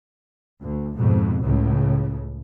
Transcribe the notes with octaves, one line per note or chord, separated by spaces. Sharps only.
D2
F2 G#2 B2
C#2 A2 C#3